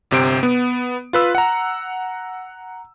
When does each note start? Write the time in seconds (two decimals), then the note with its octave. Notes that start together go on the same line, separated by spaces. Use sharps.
0.11 G1 C3 C5 D7
0.43 B3
1.13 F4 B4 E6
1.35 F#5 A#5